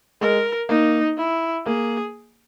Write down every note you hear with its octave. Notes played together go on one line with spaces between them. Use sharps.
G#3 A#4
A#3 D#4
E4
A#3 G#4